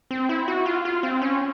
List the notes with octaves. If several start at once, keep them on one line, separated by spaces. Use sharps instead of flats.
C4
E4
F#4
F4
F4
C4
C#4